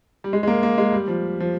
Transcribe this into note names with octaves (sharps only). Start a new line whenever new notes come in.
G3
G#3
G#3
A#3
A#3
G#3
G3
F3
F3